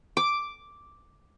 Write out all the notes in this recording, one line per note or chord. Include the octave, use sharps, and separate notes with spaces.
D6